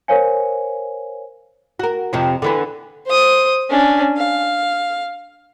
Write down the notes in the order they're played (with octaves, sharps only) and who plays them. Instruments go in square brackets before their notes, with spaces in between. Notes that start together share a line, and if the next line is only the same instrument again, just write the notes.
[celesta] A#4 C5 C#5 F5 G#5
[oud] F#4 A#4
F2 C3 F3
D3 E3 B3
[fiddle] C5 D#6
C#4 D4
F5